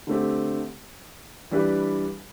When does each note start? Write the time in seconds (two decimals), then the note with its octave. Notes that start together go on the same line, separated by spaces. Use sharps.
0.07 D3 A3 C4 G4
1.51 E3 G3 D4 G4 B4